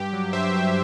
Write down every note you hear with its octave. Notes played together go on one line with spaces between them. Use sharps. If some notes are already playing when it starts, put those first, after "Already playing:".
Already playing: G2 G4
F#3
G2 C5 E5
G2